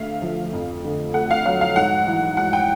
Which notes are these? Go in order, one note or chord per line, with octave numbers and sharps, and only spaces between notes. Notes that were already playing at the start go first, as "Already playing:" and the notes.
Already playing: D2 D3 A3 E5 F5
F3
F2
D3
A3 F#5
F5
F#3 F5
F5
G#2 F#5
E3
G#2 F#5
G5